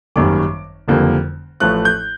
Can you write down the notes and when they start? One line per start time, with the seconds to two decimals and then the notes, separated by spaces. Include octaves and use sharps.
0.16 G#1 F#2 D#3 G3 A#3 D6
0.88 F#1 F2 D3 G3 A#3
1.60 A1 A2 F3 A3 F#6
1.85 G6